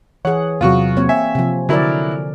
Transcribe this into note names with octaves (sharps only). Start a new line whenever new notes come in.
E3 G#4 C#5 F#5
E2 C3 F#3 F4 F#4 C#6
A#3 C4 C#5
E5 G#5
C3 F3
D3 F#3 E4 A#4 D5